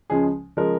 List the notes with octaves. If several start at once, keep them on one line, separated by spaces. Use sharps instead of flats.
C#2 C#3 F3 G#3 G#4
C#3 F3 G#3 A#4